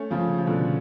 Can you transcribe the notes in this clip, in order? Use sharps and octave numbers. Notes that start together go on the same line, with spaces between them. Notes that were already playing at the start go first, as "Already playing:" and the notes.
Already playing: A3 C#4
C#3 F3
F3
B2 D3